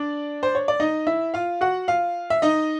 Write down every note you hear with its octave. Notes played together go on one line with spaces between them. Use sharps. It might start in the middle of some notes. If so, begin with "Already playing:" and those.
Already playing: D4 D5
C5
C#5
D5
D#4 D#5
E4 E5
F4 F5
F#4 F#5
F4 F5
E5
D#4 D#5